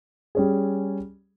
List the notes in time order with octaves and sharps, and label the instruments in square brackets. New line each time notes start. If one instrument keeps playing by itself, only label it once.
[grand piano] G3 C#4 G#4